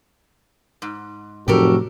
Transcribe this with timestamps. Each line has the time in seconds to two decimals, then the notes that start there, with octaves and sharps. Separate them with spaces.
0.82 G#2
1.48 F1 A2 F3 F#3 F#4 G4 A4 A#4